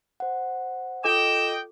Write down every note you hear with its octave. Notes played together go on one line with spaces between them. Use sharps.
C5 F#5
F4 A4 D#5 G5 D6 E7